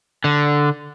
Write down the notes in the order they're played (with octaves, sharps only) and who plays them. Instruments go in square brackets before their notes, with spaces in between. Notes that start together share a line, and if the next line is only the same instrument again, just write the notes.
[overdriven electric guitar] D3